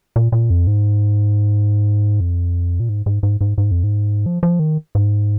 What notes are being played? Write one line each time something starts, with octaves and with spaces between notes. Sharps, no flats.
A#2
A#2
F2
G#2
F2
A#2
G#2
G#2
G#2
G#2
G#2
F2
G#2
F3
F3
D#3
G#2